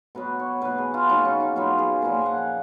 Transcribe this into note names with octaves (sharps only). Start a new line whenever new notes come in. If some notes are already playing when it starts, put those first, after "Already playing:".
B2 F#3 B3 B4
C#5
B2 F#3 B3 B4
G#4
F4
B2 F#3 B3 D#4
C#4
D#4
B2 F#3 B3 F4
G#4
A#2 F3 A#3 A#4
G#5
F#5
F5